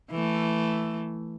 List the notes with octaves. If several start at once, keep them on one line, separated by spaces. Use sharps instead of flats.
E3 A3